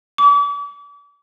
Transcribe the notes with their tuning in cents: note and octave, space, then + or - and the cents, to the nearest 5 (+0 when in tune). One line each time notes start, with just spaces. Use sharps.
D6 -40